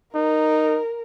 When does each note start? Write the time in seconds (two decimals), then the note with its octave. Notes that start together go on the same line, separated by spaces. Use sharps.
0.15 D#4 A#4